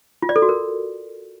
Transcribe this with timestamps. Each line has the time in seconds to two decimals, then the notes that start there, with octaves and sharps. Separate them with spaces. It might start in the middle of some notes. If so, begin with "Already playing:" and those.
0.23 F4
0.29 D5
0.36 A4
0.42 F#4
0.49 A#4